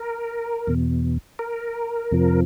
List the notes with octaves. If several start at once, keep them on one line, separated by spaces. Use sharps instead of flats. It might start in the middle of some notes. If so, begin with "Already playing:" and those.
Already playing: A#4
E2 B2
A#4
F2 C3 F3